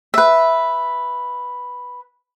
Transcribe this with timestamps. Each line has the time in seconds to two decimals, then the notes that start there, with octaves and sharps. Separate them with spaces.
0.14 B4 E5